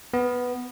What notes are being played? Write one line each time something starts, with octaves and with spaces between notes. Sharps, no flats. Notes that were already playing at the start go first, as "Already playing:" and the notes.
B3